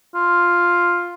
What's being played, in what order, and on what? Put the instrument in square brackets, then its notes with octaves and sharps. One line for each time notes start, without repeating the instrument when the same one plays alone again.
[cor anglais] F4